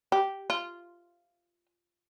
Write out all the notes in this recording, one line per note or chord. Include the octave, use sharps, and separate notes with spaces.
G4
F4